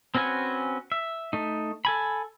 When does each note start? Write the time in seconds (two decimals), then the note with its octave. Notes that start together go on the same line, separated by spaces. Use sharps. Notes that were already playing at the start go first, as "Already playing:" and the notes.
0.15 C4 C#4 F#4 B4 G#5
0.92 E5
1.33 A3 D#4
1.85 A4 G#5 B5